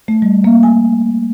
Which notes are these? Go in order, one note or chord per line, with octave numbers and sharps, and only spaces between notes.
A3
G3
A#3
G#5